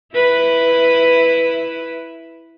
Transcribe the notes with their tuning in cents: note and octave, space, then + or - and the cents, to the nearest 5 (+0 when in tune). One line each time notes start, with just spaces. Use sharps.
E4 +0 B4 +0